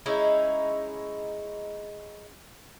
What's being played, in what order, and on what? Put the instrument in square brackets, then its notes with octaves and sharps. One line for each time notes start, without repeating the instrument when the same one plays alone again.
[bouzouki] G#3 C#4 D#4 E4